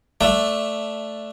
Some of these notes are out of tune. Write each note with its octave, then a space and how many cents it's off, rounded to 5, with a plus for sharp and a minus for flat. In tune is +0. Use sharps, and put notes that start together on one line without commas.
A3 +0 D4 +0 E5 +15